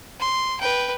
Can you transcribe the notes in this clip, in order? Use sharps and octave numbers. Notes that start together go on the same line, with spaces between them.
C6
B4 G5